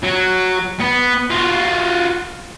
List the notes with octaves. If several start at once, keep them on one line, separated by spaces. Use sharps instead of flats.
F#3
B3
F4 F#4